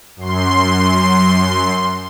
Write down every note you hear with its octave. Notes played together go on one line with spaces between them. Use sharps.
F#2 C6